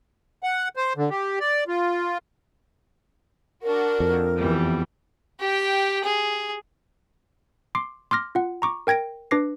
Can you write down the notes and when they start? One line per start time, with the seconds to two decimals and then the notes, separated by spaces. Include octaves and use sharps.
0.43 F#5
0.76 C5
0.97 D3
1.10 G4
1.40 D5
1.68 F4
3.63 D4 F#4 A#4
4.00 F2
4.38 E2 E3 G3
5.40 G4 G5
6.04 G#4
7.75 C6 D6 C7
8.11 C6 D6 F6 A#6
8.35 F4 F#5
8.62 A#5 C#6 D6
8.87 A#4 G5 G#6 A#6 D7
9.31 D4 B4 D6 A#6 C7